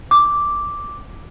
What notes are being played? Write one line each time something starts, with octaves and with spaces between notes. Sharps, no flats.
D6